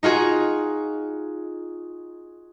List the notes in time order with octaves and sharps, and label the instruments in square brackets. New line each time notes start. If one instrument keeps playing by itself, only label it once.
[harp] D#4 F4 F#4 G#4